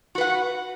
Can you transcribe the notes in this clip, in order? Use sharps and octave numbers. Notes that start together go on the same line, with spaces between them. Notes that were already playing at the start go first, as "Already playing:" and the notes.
F#4 B4 F#5